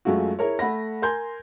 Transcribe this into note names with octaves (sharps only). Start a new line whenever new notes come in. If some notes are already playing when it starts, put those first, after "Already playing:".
F#2 G#3 A3 F4 F#4
E4 G#4 A#4 C#5
A3 F#5 B5 A#6
A#4 G#5 C6 G6 G#6